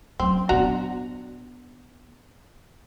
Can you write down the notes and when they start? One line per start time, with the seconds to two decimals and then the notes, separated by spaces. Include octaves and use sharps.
0.20 F#3 C4 C#4
0.49 A#2 B3 D4 F#4 A#5